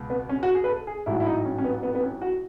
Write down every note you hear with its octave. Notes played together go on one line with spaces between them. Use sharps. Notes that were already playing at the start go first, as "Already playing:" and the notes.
Already playing: C#2 B2
B3
C#4
F#4
G#4
B4
A4
G#4
A1 G#2 F#3 A3 E4
E4
D#4
C#4
C#4
B3
B3
B3
C#4
F#4